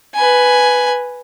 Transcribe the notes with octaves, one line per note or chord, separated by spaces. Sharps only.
B4 G#5